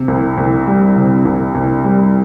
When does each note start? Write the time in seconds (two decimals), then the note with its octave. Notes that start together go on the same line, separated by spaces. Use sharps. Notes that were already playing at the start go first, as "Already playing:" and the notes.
Already playing: C3
0.08 C2
0.38 C2
0.67 G3
0.96 C3
1.25 C2
1.55 C2
1.84 G3